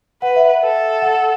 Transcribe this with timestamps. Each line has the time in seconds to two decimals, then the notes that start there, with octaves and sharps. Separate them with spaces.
0.22 B4 F#5
0.36 E5
0.63 A4
1.02 F#5